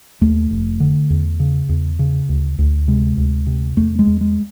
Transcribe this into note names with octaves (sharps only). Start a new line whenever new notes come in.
D#2 A3
F1
D3
E2
C#3
E2
C#3
D2
D2
C3 G#3
D2
C3
E2 A3
G#3
E2
G#3